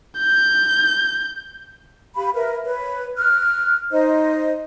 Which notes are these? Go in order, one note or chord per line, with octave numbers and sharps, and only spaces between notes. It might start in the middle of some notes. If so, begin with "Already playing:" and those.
G6
G4 F5 B5
A#4 B4 E5
B4 C#5
F6 F#6
D#4 C5 D#5